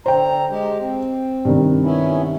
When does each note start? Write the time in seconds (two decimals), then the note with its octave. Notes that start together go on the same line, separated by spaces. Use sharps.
0.06 D3 C5 G5 A#5
0.50 G#3 G4
0.80 C4
1.45 G2 C3 D#3
1.83 B3 C#4 E4